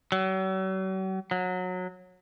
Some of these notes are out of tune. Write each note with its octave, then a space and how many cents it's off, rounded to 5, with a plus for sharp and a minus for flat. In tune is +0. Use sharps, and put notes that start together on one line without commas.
F#3 +45
F#3 -20